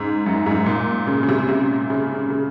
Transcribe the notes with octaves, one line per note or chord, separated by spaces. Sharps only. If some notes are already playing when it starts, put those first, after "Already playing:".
Already playing: G#2 C#3
F#2
G#2
A#2
C#3
C#3
C3
C3
C#3
C#3